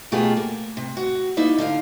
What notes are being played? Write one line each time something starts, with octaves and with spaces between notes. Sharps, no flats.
B2 A3 F4 G4 G#4 B4
A#3
C3
F#4
A#3 B3 D#4 E4 D5
D3 D#4 F5